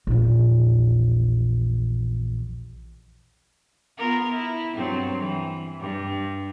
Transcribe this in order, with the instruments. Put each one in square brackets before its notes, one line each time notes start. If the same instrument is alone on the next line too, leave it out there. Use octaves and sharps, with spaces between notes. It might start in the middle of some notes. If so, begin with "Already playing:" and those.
[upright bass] A#1 E2
[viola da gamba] B3 F4 A#4
E4
G2 F#3 C4
E3
G2